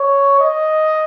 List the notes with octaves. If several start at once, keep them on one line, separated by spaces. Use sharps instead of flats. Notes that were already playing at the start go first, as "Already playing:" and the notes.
Already playing: C#5
D#5